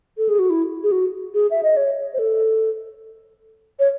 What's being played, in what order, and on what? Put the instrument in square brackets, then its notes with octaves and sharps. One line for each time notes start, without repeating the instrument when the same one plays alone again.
[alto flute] A4
G#4
F#4
E4
G#4
F#4
G#4
E5
D#5
C#5
C5
A4
C#5